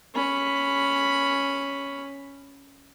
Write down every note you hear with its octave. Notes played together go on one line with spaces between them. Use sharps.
C#4 B5